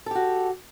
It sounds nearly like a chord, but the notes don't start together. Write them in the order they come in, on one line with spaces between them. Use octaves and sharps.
A4 G4 F#4